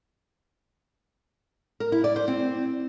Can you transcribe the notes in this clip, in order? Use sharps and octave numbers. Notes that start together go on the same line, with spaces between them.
A#4
E4
D5
C5
C4